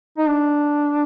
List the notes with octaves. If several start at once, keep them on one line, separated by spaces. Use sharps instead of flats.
D#4
D4